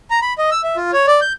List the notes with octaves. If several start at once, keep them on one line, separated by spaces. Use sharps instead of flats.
A#5
B5
D#5
E6
E5
F4
C#5
D5
G6